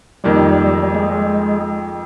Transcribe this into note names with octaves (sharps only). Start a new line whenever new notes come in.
F2 D#3 G3 A#3
G3
G#3